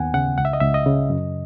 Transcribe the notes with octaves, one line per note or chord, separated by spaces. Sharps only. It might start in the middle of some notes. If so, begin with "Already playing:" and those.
Already playing: D#2 B3 F#5 G#5
C#3 F#5
C#2 F#5
E5
D#5
C#2 E5
D#5
C#3
F#2